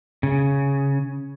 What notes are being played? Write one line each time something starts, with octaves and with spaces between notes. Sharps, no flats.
C#3